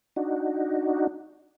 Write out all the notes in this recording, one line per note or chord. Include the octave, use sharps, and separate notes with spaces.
D4 D#4 F#4